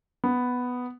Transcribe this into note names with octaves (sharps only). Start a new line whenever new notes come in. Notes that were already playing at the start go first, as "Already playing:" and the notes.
B3